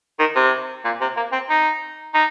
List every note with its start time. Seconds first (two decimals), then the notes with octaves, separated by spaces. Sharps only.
0.19 D#3
0.36 C3
0.85 A#2
1.01 C3
1.17 A#3
1.32 C4
1.49 D#4
2.14 D#4